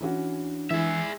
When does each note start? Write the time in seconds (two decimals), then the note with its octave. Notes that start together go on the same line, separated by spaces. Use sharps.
0.01 E3 C#4 D4 F#4
0.71 E3 G#3 E4 G#4 E5